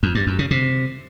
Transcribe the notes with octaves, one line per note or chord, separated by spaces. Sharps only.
F2
G2
F#2
C#3
C3